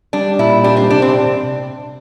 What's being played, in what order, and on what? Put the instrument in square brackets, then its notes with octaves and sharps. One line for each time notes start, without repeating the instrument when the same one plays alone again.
[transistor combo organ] G3 [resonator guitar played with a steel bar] D4
[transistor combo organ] A#2 [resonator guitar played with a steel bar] E4
[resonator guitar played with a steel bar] D4 [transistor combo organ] G4
[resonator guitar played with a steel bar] C4
[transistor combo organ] C3 [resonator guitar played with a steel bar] D4
[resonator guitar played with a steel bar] C4